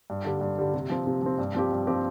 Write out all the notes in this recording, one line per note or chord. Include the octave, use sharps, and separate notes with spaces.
G2
D3 G3
G2
D3 G3
C3
F3 C4
C3
F3 C4
G2
F3 C4 G4
G2
F3 C4 G4